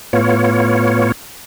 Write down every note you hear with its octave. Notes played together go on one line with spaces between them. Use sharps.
A2 B3 F4 C#5